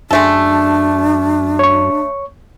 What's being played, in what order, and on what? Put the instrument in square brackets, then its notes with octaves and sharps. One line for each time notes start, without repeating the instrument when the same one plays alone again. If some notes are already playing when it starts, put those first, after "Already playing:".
[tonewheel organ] F#2 [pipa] G#3 A3 A4 [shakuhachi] D4
[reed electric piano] C#5 C#6